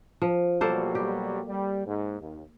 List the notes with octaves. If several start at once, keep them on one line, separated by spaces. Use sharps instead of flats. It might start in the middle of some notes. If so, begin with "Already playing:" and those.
F3
B2 F#3 G3 A#3 A4 C5
G4
G3
G#2
D#2